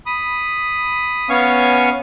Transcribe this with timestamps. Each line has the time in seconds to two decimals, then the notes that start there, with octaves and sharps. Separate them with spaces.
0.06 B5 D#6
1.30 B3 C#4 C#5 F5 G#5 C#6